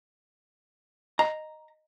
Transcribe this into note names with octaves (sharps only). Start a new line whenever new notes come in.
D#5 A#5